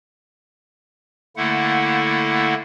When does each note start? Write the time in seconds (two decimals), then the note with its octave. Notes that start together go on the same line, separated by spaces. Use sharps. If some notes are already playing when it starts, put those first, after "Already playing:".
1.37 D3 A3 A#3 E4 F#5